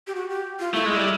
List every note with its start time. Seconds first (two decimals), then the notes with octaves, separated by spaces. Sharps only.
0.07 G4
0.15 F#4
0.29 G4
0.60 F4
0.74 A3 E4
0.86 G#3
0.97 G3